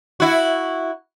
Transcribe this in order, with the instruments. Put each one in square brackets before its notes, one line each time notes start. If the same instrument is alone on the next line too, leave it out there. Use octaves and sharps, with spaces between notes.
[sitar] E4 F#4